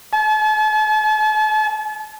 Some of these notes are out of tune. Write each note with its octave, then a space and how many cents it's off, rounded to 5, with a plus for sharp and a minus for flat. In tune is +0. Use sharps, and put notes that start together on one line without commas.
A5 -45